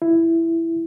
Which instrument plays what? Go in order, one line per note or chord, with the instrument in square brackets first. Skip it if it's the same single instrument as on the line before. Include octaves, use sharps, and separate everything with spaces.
[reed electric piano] E4